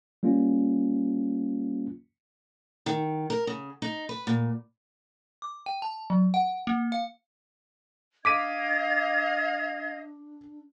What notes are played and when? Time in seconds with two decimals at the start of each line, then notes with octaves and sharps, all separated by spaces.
0.23 G3 A#3 C#4 F4
2.86 D#3
3.30 A#4
3.47 C#3
3.82 D#4
4.09 B4
4.27 A#2
5.42 D6
5.66 G5
5.82 A5
6.10 F#3
6.34 F#5
6.67 A#3
6.92 F5
8.25 D4 D#5 F5 D6 G#6 B6 D#7